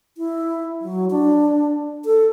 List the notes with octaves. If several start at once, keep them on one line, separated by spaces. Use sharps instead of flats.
E4
F#3
D4
A4